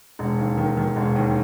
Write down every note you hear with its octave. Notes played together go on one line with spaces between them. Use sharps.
E1
D#2
D#3
D#3
E1
D#2